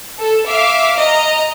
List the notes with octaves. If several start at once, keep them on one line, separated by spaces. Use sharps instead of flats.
A4
E5 F5 D6
D#5 A#5